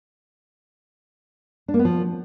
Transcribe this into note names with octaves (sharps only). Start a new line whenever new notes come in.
D4
A#3
B3
F3